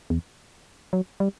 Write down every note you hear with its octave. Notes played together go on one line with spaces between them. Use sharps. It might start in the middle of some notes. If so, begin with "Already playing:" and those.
E2
F#3
G3